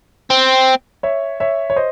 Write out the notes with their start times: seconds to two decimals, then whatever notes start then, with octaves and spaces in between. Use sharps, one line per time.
0.30 C4
1.03 C#5 E5
1.40 C#5 E5
1.70 C#5
1.76 C5 D#5